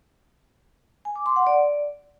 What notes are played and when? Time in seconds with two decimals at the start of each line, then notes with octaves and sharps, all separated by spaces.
1.05 G#5
1.16 D6
1.26 C6
1.36 F#5
1.47 D5